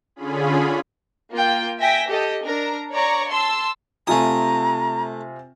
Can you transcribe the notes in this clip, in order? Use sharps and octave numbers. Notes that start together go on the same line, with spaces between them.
D3 C#4 F4 G#4 B5
A#3 F4 G5
E5 G5 G#5 A#6 B6
G4 A4 D#5
D4 A#4 A#5
C#5 D5 A#5 C#6
A5 C6 E6
C3 A3 F4 G#5 A#5 D#6